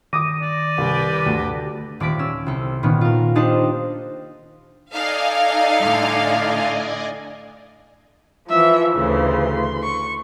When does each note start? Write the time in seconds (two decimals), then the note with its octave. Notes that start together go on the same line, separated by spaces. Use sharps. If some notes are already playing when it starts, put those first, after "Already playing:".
0.13 D#3 D6 D#6
0.42 D5
0.78 C2 G4 B4
1.26 D2
2.00 D#1 D5 A5 B6 D7
2.19 C#4 E6
2.46 C2 A4
2.83 A#2 D#3 B3 C#4
3.01 F4 A#4
3.35 D4 D#4 G4 C5 D#5 A5
4.92 D#4 A4 D5 D#5 F5 G#5
5.81 A2 D3
8.49 E3 F3 E5
8.97 D2 C#3 E3 C6
9.84 C#6